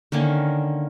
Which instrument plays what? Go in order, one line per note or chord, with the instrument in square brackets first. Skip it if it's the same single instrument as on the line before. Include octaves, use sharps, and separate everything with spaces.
[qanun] D3 D#3 A#3 C#4